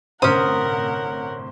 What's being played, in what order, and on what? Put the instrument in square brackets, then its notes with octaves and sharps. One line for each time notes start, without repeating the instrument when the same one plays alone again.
[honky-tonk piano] G1 A2 C3 [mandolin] C#4 D#6 [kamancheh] A#4 F#5 [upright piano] C5